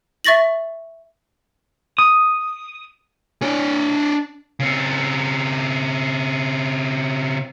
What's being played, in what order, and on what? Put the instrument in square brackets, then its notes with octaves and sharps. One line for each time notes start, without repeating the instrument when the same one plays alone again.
[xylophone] E5 C#6 A6 A#6 F#7
[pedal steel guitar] D#6
[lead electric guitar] D4 C#5
C#3 C4